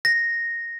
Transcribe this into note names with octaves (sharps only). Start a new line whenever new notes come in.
A#6